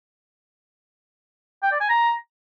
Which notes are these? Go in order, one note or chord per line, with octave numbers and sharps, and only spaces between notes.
G5
D5
G#5
A#5